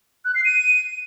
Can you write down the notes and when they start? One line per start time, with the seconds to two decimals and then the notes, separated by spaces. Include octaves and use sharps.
0.25 F#6
0.35 C7
0.45 D#7